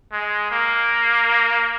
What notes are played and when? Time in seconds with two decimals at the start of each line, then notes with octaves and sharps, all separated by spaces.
0.13 G#3
0.51 A#3